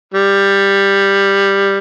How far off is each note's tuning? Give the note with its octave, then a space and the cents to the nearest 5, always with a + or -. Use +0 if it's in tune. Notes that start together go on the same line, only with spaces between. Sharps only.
G3 +10